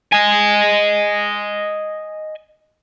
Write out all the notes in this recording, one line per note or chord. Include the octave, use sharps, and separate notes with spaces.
D#5 G#5